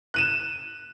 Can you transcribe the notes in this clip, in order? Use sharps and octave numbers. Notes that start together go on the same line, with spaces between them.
F#6 D#7 E7